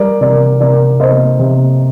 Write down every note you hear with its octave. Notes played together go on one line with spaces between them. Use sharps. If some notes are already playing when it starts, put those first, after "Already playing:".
Already playing: G3 A#4 D5
C3 A#4 D5
C3 A#4 D5
C3 C5 D#5
C3